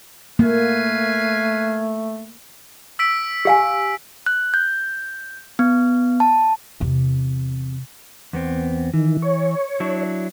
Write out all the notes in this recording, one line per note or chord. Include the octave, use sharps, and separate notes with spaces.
A3 A#3 B4 F5 G#5
E6 B6 D7
G4 F5 G#5
F#6
G6
B3
A5
E2 C3
E2 B3 C4
D#3 E3
C#5
F#3 D4 E4